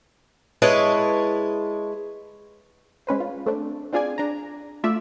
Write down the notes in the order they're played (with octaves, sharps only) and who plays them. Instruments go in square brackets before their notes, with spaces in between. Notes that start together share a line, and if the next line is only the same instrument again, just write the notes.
[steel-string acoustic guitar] G#3 E4 B4 C#5 D#5 A5
[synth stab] G#3 C#4 B4 C5
F4
A3 C4 D4
C4 D4 F4 G#4 D5 G#5
D4 A#5
A3 F4 D5 E5